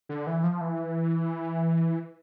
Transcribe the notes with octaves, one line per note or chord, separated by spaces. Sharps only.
D3
E3
F3
E3